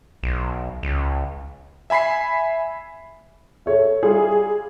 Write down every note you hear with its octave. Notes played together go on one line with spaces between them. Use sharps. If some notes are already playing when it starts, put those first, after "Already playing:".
B1
C#2
E5 G#5 B5 B6 C7
A4 C#5 E5
G3 F4 G#4